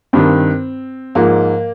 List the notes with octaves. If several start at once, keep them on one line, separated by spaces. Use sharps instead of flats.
G2 D#3 C4
G#2 F3 A#3